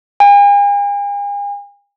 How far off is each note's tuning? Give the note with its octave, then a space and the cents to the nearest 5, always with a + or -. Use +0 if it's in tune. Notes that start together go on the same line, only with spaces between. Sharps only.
G#5 -45